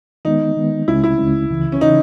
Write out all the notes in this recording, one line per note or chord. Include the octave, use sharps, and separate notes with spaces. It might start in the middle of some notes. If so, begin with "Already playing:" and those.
D#3 G#3 B3 D#4
D#3 G#3 B3
C#2 C#3 G#3 C#4 E4
E4
C#2 C#3 G#3 C#4
C#2 C#3 E3
C#4
C#3 E3 D#4